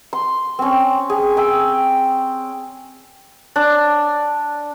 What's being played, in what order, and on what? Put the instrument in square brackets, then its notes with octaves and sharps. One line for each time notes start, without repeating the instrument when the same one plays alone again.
[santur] C6
C4 C#4
G#4
G5 G#5 E6
D4